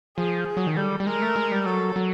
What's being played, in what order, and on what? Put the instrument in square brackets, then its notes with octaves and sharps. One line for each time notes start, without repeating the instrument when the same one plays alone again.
[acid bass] F3 [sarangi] G#4
[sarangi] G#4
[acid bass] F#3
D#3
[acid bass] G3 [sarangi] A4
[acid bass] G3
[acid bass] G#3 [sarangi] A#4
[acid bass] A3
G#3
G3
[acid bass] F#3 [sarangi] A4
[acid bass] F#3